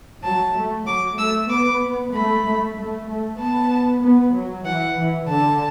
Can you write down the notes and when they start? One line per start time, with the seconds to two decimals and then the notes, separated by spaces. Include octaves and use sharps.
0.24 F#3 A5
0.55 A3
0.86 F#3 D6
1.18 A3 E6
1.49 B3 D6
2.13 A3 B5
2.45 A3
2.76 A3
3.08 A3
3.39 B3 A5
4.02 B3
4.34 F#3
4.66 E3 F#5
4.97 E3
5.29 D3 A5